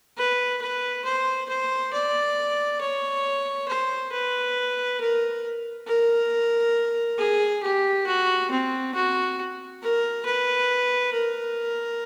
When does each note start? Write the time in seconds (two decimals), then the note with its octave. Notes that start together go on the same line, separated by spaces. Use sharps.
0.17 B4
0.61 B4
1.05 C5
1.49 C5
1.93 D5
2.81 C#5
3.68 C5
4.12 B4
5.00 A#4
5.87 A#4
7.18 G#4
7.63 G4
8.07 F#4
8.50 C4
8.95 F#4
9.82 A#4
10.25 B4
11.13 A#4